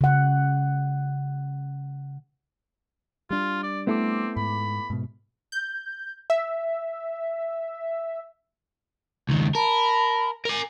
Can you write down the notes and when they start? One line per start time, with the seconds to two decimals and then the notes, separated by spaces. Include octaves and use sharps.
0.01 C#3 F#5
3.31 G3 D4 F4
3.63 D5
3.87 A3 B3 C4 E4 A4 D6
4.37 G#2 B5
4.90 G#2 B2
5.52 G6
6.30 E5
9.29 C#2 D#3
9.55 A#4 A5 B5
10.45 A#4 G#5